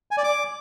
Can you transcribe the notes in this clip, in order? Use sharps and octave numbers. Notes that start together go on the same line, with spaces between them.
G#5
D5
D6